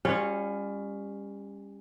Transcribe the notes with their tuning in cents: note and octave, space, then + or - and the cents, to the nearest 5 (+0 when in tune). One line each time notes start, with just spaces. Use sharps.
G3 +35 C#4 +0 F4 +0